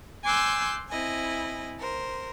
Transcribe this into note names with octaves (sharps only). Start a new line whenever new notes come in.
G#5 C6 D6 E6 F#6 G6
C4 E4 D#5 G#5
A#4 C5